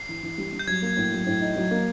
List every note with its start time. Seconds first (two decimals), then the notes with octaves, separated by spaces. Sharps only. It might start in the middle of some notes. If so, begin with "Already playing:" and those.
Already playing: C7
0.09 E3
0.23 E3
0.38 G3
0.53 G3
0.59 G6
0.67 F#3 G#6
0.82 A#3
0.97 A2
1.12 F#3
1.26 A2
1.41 D#4
1.56 F#3
1.71 A#3